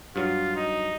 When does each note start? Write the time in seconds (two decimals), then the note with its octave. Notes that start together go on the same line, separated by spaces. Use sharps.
0.16 G2 F#3 F4
0.56 D#4